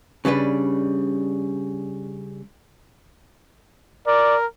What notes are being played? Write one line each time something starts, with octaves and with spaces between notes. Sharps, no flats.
C#3 G3 D4 B4
A#4 D5